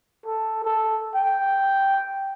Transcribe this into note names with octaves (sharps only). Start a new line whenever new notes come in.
A4
A4
G5